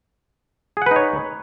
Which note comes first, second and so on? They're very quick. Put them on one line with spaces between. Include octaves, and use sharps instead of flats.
G#4 F#5 B4 D#4 C#5